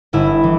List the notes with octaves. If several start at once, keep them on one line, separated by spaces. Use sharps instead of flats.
G1 E4
E3